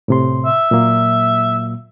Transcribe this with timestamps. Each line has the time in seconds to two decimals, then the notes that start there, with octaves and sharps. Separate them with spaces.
0.08 A2 C3 C6
0.46 E5
0.71 A#2 F#3 A#3